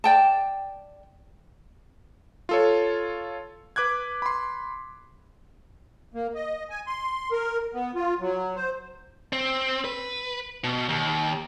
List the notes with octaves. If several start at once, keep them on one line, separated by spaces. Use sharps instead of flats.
D5 G5 A5
F4 A4 C#5
B4 D6 F#6 G#6
B5 C6
A#3
D#5
G#5
C6
A#4
B3
F4
F#3
C5
C4
B4
B2
D#2